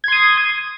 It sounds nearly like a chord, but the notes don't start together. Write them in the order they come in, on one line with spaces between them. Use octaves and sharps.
G#6 C6 D#6